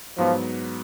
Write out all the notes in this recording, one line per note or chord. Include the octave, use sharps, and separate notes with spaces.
G#2 F3 F#3 B3